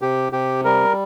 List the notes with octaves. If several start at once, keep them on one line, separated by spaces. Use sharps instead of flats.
C3 G4
C3 G4
G3 A#4